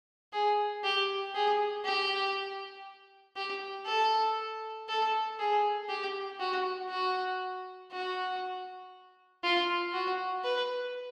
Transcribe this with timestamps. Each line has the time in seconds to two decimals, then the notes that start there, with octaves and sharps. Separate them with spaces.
0.33 G#4
0.84 G4
1.35 G#4
1.85 G4
3.37 G4
3.86 A4
4.89 A4
5.39 G#4
5.89 G4
6.40 F#4
6.90 F#4
7.92 F#4
9.44 F4
9.94 F#4
10.44 B4